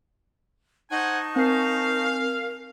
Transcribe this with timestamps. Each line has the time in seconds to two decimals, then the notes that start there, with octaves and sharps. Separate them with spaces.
0.90 D#4 C5 F#5 G#5 A5 C#6
1.36 C4 A#4 F5 G#5 C7